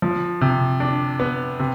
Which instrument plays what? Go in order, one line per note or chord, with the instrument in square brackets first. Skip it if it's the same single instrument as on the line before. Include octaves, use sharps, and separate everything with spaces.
[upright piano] F3
C3
D4
B3
C3